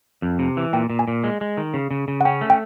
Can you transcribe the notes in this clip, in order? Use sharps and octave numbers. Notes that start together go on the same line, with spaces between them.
F2
C3
E3
A#2 G5
A#2
G#5
A#2
G#3
G#3
D#3
C#3
C#3
C#3
F#5
C#4 G5
A3
G5